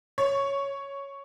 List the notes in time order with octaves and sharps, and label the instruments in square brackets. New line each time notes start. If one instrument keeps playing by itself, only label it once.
[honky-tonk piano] C#5